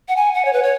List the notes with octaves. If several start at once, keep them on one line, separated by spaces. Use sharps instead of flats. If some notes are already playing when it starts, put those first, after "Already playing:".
F#5
G#5
F#5
C#5
B4
C#5